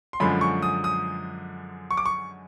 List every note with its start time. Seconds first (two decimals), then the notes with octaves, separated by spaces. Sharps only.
0.13 C6
0.20 F#2 D3 F3 G#3 B5
0.41 C#6
0.62 D#6
0.84 D#6
1.91 C#6
1.97 D6
2.06 C#6